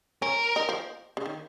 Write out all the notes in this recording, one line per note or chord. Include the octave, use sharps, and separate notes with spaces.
C#4 A#4
D#4
F3
C#3
D#3